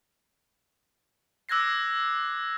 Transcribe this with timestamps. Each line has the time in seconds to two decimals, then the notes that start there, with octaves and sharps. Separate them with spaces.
1.49 D6 E6 F#6 G#6 A#6 C7